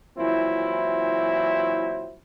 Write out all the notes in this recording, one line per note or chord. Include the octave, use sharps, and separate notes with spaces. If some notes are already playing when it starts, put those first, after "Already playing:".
A#2 E3 F#3 C4 E4